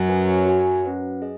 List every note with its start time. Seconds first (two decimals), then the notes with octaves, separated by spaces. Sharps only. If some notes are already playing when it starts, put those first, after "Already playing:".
Already playing: F#2 F#3
0.09 C#4 F#4 B4 G#5
0.46 F#4 C#5 G#5
0.84 C#4 B4 F#5
1.22 G#4 D#5